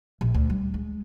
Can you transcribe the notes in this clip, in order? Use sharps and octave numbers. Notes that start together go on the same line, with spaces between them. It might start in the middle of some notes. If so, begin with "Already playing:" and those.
A#1
D2
G3
G#3